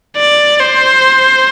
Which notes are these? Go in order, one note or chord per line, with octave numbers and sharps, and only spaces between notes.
D5
C5